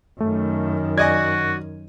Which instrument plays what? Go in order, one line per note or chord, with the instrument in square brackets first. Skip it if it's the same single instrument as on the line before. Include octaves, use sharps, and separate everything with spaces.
[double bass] F#2 D#3 [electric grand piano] A3
[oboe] F#4 [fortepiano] D5 D#5 G#5 [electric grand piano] G#6